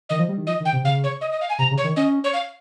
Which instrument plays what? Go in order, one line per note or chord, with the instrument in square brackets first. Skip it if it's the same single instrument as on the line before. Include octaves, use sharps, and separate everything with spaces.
[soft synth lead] D#3 [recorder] D#5
[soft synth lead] F3
G3
D#3
[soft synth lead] F3 [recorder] D#5
[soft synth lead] D#3
[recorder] G5
[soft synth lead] C3
[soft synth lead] C#3 [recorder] F5
[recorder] C#5
D#5
D#5
F5
G#5
[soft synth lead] C3 [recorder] A#5
[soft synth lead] C#3
[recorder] C#5
[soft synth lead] D#3
[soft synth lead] C#4 [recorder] D#5
[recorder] C#5
F5